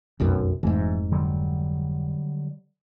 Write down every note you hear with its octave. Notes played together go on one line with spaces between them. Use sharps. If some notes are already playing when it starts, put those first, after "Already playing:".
F1 B1 F#2
F1 G#2 E3
D3 F#3 G3